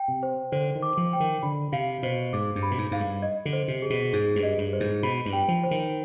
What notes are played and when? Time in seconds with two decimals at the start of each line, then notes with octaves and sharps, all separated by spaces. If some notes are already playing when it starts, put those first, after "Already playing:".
Already playing: G5
0.08 C3
0.23 C5
0.52 D3 C5
0.75 D#3
0.82 D6
0.97 F3
1.13 G5
1.20 D#3
1.43 D3 B5
1.72 C3 F5
2.03 B2 C5
2.33 G#2 D6
2.55 G2
2.63 B5
2.71 B2
2.78 G#2
2.91 G#2 F5
3.00 G2
3.22 D#5
3.45 D3
3.53 C5
3.68 C3
3.82 G#4
3.90 B2
4.13 G#2 G#4
4.36 G2
4.43 D#5
4.58 G2
4.73 C5
4.80 G#2
5.03 B2 B5
5.26 G2
5.33 G5
5.48 F3
5.63 C5
5.71 D#3